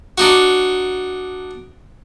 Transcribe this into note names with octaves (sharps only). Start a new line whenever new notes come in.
D4 D#4 F#4